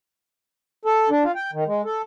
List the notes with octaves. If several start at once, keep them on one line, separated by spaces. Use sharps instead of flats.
A4
D4
F4
G5
D#3
G#3
A4